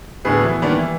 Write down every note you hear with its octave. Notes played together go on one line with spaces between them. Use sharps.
D1 A2 D3 B3 G#4 B4
E3 B3
D#3 G3 A#3 B3 D4
E3